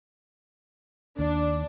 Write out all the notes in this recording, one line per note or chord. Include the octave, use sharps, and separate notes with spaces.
D#2 D4